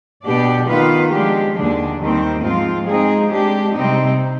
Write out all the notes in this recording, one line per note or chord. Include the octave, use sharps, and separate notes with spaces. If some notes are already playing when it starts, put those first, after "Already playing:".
B2 B3 D4 G4 D5
D#3 B3 F4 B4 F5
F3 G#3 D4 G4
D#2 D3 G#3 D4
D#2 D#3 G3 C4
G#2 F3 C4 F4
G#3 C4 D#4 G#4
G#3 D4 G4
C3 G3 C4 D#4